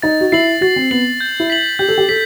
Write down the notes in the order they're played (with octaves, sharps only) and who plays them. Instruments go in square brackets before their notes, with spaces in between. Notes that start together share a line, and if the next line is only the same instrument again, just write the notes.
[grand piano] D#4 [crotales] A6
[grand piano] F#4
[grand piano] E4 [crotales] C7 F#7
[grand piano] F#4 [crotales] A6
[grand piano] C4
[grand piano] B3 [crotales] C7 F#7
[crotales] G6
[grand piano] E4
[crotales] B6 F#7
[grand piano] G4 [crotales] G6
[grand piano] A4
G4
[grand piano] A4 [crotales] B6